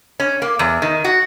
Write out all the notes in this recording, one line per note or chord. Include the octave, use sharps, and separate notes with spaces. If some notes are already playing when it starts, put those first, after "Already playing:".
C#4
A#3
E2
D#3
F#4